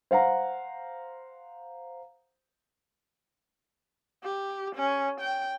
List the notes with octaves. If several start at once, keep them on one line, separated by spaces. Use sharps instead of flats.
C5 F5 F#5 A#5
G4
C#4
G5